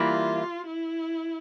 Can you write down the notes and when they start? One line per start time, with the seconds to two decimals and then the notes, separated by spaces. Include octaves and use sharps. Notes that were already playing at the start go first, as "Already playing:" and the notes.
Already playing: E3 G3 A#3 E4 F4
0.67 E4